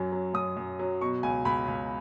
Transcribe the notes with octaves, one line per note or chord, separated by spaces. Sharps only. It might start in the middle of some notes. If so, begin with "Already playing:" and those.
Already playing: F#2 F#3
F#3
F#2 D#6
F#2
F#3
B2 C#6
C#2 G#5
C#2 B5
C#2